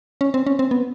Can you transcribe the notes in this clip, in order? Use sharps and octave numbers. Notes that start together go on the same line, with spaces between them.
C#4
C4
C#4
C4
B3